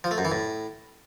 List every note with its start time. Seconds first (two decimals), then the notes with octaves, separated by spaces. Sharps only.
0.04 F3
0.11 A3
0.18 F#2
0.25 E3
0.32 A2